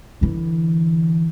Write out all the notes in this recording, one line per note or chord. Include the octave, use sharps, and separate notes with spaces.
D3 E3